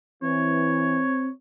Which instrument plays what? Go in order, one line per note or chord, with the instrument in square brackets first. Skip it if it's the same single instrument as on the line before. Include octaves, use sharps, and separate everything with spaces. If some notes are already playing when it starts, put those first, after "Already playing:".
[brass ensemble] E3 [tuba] C4 [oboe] C#5